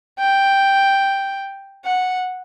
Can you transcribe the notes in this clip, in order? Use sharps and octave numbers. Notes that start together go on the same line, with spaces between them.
G5
F#5